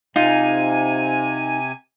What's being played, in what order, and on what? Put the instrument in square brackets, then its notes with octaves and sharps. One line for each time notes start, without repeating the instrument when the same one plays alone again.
[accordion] C3 G#5 [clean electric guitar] D#4 [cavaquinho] F4